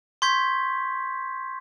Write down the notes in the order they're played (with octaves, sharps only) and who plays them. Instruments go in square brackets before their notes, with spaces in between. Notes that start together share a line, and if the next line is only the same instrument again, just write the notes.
[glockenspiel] C6 C#6 G6 G#6 B6